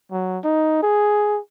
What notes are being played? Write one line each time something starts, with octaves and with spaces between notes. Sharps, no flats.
F#3
D#4
G#4